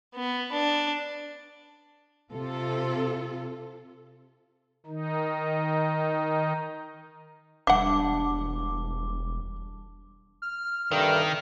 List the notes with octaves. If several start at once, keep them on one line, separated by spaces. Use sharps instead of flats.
B3
D4
C3 F4 A4
D#3 D#4
E1 G3 D4 E5 F#5 D6
F6
G2 C3 D#3 A4 A#4